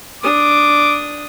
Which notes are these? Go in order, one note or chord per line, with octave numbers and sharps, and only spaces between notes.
D4 D6 D#6